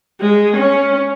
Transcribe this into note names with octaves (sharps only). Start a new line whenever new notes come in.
G#3
C#4